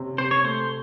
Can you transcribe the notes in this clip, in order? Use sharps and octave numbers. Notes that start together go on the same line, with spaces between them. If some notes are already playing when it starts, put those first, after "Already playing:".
Already playing: C3 C#4
C3 C5
C#5
A3 C5